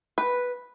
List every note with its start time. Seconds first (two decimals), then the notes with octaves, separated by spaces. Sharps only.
0.18 B4